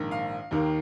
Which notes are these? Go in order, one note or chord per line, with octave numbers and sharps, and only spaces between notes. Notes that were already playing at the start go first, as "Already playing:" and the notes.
Already playing: A#1 G#2 D#3 A#3
F5
D#2 D#3 A#3